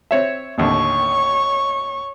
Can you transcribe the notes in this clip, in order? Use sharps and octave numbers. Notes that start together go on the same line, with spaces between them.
C4 C#5 E5
A1 D#2 D3 C#5 C#6